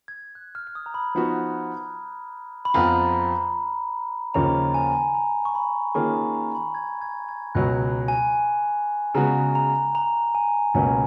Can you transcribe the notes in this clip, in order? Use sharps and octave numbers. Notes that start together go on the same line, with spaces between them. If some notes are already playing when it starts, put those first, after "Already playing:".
G#6
F#6
F6
F6
D#6
A#5
B5
F3 B3 D#4 F#4
B5
F2 F3 B3 F4 A#5
D#2 C#3 F3 A#3 C#4 A#5
G#5
A#5
C#6
B5
D#3 A#3 C#4 F4 G#4 C#6
A#5
A#5
B5
G#6
G#6
G#6
C#2 B2 F#3 F#6
G#5
C#3 G#3 B3 F#4 A#5
A#5
A#5
G#5
C#2 B2 F#3 A#3 C#4 G#5